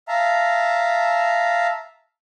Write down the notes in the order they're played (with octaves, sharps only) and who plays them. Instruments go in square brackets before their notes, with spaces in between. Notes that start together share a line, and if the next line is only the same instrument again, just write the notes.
[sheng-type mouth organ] E5 F5 A5 A#5